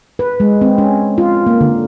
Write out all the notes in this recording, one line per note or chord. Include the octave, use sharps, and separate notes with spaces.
B4
G#3
C4
C#4
F4
A#3
D3